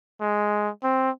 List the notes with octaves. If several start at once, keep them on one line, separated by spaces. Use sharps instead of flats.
G#3
C4